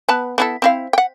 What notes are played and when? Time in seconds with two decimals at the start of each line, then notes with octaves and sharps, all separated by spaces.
0.09 B3 B4 A5
0.38 B3 E4 A4
0.62 C4 E4 F5
0.93 F#5 G5